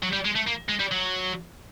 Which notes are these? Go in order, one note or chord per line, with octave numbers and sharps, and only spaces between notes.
F#3
G3
G#3
A3
A#3
G#3
G3
F#3